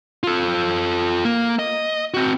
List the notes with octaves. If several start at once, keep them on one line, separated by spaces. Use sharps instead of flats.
F4 A4
A#3
D#5
C4 F#4